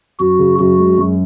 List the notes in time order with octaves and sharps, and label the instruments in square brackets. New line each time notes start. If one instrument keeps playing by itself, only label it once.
[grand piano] F#2 [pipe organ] F#4
[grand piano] C#3
[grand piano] F#2 [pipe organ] F#4
[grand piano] G#3
F#2